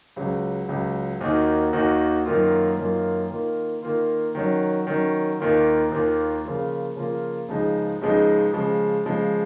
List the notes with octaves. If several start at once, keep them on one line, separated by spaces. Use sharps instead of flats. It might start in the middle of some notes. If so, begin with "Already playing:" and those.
C#2 C#3 F#3
C#2 C#3 F#3
D#2 D#3 A#3 D#4 F#4
D#2 D#3 A#3 D#4 F#4
F#2 D#3 A#3 F4
F#2 D#3 A#3 F4
D#3 A#3 F4
D#3 A#3 F4
D#3 F#3 C#4
D#3 F#3 C#4
D#2 D#3 A#3 F4
D#2 D#3 A#3 F4
C#3 F3 A#3 F4
C#3 F3 A#3 F4
C#2 C#3 F3 G#3 D#4
C#2 C#3 F3 G#3 D#4
C#3 F3 G#3
C#3 F3 G#3